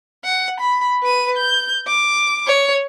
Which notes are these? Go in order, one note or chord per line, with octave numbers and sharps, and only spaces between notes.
F#5
B5
B4 D#7
G6
D6
C#5